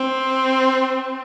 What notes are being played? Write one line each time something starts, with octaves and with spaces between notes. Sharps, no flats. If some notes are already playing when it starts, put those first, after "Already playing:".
Already playing: C4